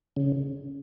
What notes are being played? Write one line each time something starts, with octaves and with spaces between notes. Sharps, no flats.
C#3